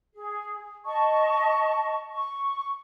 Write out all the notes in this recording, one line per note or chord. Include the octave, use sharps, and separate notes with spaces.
G#4
D#5 A5 C#6
C#6